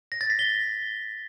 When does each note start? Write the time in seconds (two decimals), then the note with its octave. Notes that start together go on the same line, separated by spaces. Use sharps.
0.12 A#6
0.21 A6
0.30 B6
0.39 G7